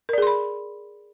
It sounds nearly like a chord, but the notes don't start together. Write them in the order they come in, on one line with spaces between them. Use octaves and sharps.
A#4 D5 G#4 C6 B5